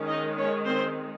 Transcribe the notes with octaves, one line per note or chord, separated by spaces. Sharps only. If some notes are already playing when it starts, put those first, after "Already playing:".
Already playing: D#3 G#3 C#4
D#4 D#5
C#4 C#5
C4 C5